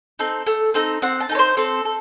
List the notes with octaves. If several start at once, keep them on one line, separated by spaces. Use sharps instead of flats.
C4 D#4 A4
A3
C4 D#4 A4
C4 F#5
A5
D#4 A4
C#5
C5
C4 A4
A4